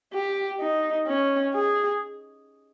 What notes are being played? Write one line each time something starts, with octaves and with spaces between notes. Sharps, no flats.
G4
D#4
C#4
G#4